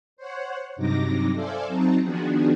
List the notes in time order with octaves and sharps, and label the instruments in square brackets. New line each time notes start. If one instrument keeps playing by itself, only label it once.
[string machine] C5 C#5 F#5
G2 C3 F#3 D#4 D6 A#6
A4 C5 D5 E5 F5 G#5
F#3 C4 D#4 A5 A#5
D#3 F3 B3 D4 F#4 G#4